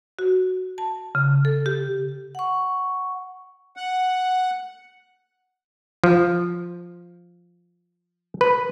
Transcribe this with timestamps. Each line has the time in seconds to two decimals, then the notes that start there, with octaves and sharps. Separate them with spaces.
0.19 F#4
0.78 A5
1.15 C#3
1.45 A4
1.66 G4
2.35 F#5 C#6
3.77 F#5
6.04 F3
8.41 B4